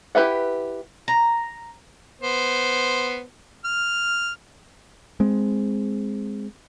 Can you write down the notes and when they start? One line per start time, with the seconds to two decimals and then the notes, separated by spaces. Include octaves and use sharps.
0.15 E4 G4 B4 E5 F#5
1.08 A#5
2.21 B3 C5
3.65 F6
5.20 G#3 C4